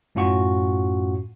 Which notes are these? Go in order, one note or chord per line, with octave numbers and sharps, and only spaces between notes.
F#2 A2 C#4 F4 F#4 C#6